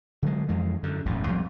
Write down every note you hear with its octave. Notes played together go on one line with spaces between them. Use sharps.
D3 F#3 G#3
F2 E3 G#3
F#2 D3
E1 A1 F#2 A#2
B1 F2 G#2 G3